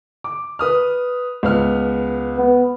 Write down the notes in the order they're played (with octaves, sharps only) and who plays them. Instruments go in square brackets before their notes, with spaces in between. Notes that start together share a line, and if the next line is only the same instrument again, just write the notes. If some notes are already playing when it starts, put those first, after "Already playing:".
[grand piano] D6
B4 D#6 F6
C#2 B3 F6
[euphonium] B3